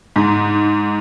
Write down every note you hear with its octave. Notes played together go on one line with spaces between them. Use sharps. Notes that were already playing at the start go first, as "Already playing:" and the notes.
G#2